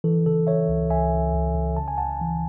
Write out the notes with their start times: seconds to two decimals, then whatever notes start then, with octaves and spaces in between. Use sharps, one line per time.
0.04 E3 A4
0.26 C#3 A4
0.47 C#3 C#5 E5
0.69 C#2
0.90 C#2 E5 G#5
1.13 C#3
1.34 C#2
1.55 C#2
1.77 C#3 A5
1.88 G#5
1.98 C#2 F#5 A5
2.21 E3